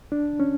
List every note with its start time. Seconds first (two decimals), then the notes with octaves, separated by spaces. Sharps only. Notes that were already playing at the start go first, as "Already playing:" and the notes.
0.12 D4
0.40 C#4